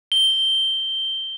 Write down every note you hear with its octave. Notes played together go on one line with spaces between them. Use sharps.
G7